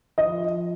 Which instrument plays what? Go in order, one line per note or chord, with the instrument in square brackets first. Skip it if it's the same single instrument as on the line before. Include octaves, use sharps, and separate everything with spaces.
[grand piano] F3 D#5